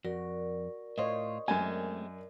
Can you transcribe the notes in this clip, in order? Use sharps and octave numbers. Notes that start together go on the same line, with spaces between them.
F2 F#4 A#4 D5
A2 F4 C5 C#5 D#5
F#2 G#3 A3 C4 G#5